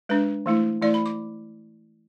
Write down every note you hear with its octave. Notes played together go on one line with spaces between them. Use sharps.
G#3 D4 B4
E3 A3 E4
E3 A3 E4 D5
B5
D6